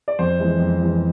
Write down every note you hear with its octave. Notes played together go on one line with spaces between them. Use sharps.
D5
F2 C5
E3 G#3
F2
E3 G#3